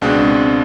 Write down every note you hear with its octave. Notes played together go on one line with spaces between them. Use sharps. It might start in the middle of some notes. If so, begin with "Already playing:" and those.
C#2 B2 G#3 C4 D4